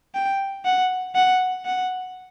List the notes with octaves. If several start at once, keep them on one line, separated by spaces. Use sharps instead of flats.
G5
F#5
F#5
F#5